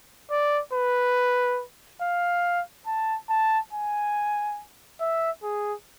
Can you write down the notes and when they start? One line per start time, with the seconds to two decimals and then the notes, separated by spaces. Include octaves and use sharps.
0.31 D5
0.73 B4
2.01 F5
2.87 A5
3.29 A5
3.73 G#5
5.01 E5
5.43 G#4